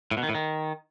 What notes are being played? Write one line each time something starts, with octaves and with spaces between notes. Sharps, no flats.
A2
B2
D#3
A2
D#3